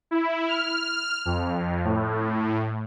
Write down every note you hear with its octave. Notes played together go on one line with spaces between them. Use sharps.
E4
F6
F2
A2